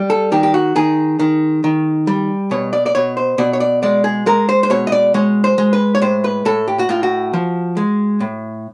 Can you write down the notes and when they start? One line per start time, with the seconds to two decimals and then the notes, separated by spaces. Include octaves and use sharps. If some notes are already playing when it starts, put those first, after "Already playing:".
Already playing: G3
0.10 A4
0.32 D#3 G4
0.43 G4
0.54 F#4
0.76 D#3 G#4
1.19 D#3
1.64 D#3
2.07 G3
2.51 B2 C#5
2.73 D5
2.86 D5
2.95 B2 C#5
3.17 C5
3.38 B2 D5
3.53 C#5
3.60 D5
3.83 G#3 D5
4.04 G#4
4.26 G#3 A#4
4.49 C5
4.63 C5
4.70 B2 C#5
4.87 D#5
4.92 D5
5.14 G#3 C#5
5.44 C5
5.58 G#3
5.73 B4
5.95 C#5
6.02 A2 C5
6.24 B4
6.45 A2 A4
6.68 G4
6.79 F#4
6.89 A2 F4
7.03 F#4
7.33 F3
7.77 G#3
8.20 A2